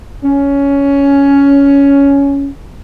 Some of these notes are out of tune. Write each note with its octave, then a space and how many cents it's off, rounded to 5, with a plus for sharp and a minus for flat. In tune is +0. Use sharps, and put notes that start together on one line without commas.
C#4 +10